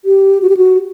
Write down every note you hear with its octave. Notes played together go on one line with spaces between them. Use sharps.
G4
F#4
G4
F#4